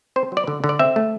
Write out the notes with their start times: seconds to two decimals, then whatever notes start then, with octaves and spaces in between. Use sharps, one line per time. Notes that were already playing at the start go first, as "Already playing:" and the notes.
0.16 C4 C5
0.32 F#3
0.37 D5
0.47 D3
0.64 D3
0.69 D5
0.79 C4 E5
0.96 A3